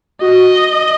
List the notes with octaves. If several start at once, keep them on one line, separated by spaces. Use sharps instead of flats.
F#4 D#5